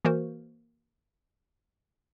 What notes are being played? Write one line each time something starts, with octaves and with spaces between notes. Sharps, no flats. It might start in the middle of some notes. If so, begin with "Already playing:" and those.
E3 A#3 F#4 A#4 C5